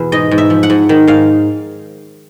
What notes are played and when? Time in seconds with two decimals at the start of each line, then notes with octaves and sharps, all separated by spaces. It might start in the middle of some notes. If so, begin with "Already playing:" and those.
Already playing: E2 B2
0.12 G#2 D#5
0.31 G#2
0.38 E5
0.50 F3
0.63 F#5
0.70 G#2
0.89 D#3
1.07 G#2 F5